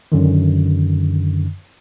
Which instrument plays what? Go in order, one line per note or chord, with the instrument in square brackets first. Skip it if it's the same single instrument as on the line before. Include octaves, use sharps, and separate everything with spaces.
[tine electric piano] F#2 D3 D#3